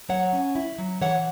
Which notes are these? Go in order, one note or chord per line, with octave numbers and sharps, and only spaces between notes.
F#3 C#5 F#5
C#4
E4
F#3
E3 C#5 F#5